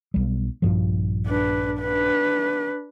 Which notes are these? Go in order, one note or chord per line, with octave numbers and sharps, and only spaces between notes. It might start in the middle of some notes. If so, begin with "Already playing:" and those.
B1 G3
A#1 G2 F3
D4 B4
D4 B4